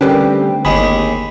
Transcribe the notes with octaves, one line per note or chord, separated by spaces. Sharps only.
D2 D3 G3 C4 C#4 G4 A#4 B4
G1 D#2 G#3 G#4 B5